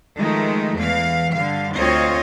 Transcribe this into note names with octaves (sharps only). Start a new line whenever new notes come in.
D#3 F3 G#3 A3 D#4
E2 E3 F5
G2 D3 F5
D2 C4 F4 C#5 D#5 F5